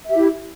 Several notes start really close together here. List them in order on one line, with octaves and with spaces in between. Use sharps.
E5 G4 E4